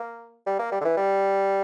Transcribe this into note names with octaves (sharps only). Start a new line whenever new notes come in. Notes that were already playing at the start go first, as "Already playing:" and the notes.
Already playing: A#3
G3
A#3
G3
D3
E3
G3